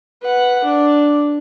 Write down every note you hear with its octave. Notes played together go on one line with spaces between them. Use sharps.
B4 F#5
D4